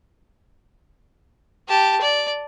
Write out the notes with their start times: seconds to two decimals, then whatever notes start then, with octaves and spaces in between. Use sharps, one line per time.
1.68 G4 A5
2.01 D5